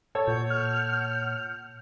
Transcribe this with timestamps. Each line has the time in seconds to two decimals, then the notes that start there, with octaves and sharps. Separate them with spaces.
0.15 A4 C#5
0.28 A#2 F#5 G6
0.50 F6